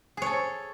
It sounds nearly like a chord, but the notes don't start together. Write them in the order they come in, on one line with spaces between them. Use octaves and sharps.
G#4 C#5 A4